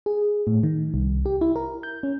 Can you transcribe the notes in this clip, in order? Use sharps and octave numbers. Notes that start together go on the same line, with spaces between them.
G#4
A2
D#3
C2
G4
E4
A#4
G6
C#4